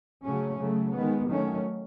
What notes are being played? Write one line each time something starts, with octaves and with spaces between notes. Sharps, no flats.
C#3 F#3 A3 C#4
C#3 F#3 A3
D#3 G#3 B3
D#3 F#3 A3 C#4